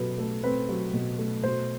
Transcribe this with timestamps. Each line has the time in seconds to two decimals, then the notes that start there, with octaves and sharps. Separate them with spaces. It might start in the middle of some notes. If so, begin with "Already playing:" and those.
Already playing: B2 F#3 G4 A4 B4
0.18 A3 A4
0.43 C4 B4
0.69 F#3
0.94 B2
1.18 A3
1.43 B2 C5